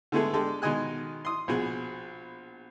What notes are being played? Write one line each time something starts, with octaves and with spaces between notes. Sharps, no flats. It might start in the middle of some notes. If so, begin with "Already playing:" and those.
D3 G#3 A3 B3 G#4 A4
G#3 D4 G4 A4
B2 D#3 G#3 D#5 G#5 F#6
C6 D#6
A#1 B2 G#4